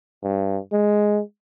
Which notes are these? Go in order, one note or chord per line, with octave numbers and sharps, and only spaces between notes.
G2
G#3